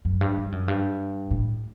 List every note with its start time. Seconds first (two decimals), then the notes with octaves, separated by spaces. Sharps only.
0.05 F#2
0.21 G2
0.37 G2
0.52 F#2
0.68 G2
1.31 A2